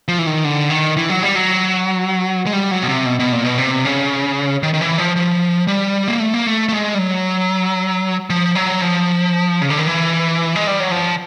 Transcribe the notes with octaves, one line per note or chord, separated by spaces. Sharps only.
F3
E3
D#3
D3
D#3
E3
F#3
G3
F#3
G#3
G3
F#3
B2
C3
B2
B2
A#2
B2
C3
C#3
D#3
D#3
E3
F3
F3
G3
A#3
A3
A#3
A3
A3
G#3
G3
F#3
F3
F#3
F3
C#3
D3
D#3
E3
G#3
G3
F#3
F3